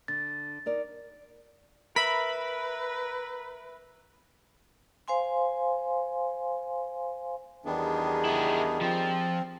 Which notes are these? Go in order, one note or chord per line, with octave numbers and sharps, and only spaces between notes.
D3 A6
D#4 A#4 D5
A#4 B4 E5 B5
C5 F5 G#5 C6
E2 D#3 G3 B3 D4 G#4
E4 A#4
F3 C4